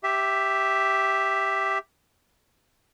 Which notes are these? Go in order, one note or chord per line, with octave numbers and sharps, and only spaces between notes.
G4 E5